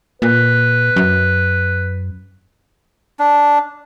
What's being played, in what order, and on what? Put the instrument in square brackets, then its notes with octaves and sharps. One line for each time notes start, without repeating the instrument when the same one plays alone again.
[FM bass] A#2 [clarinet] B4
[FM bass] F#2
[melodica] D4